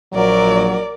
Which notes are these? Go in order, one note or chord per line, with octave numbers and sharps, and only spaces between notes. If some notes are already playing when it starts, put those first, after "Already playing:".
A#1 F#3 A#4 D5